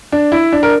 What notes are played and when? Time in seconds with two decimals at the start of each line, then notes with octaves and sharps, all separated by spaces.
0.12 D4
0.32 E4
0.53 D4
0.63 A#4